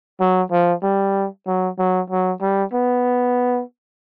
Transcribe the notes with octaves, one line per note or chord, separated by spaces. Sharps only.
F#3
F3
G3
F#3
F#3
F#3
G3
B3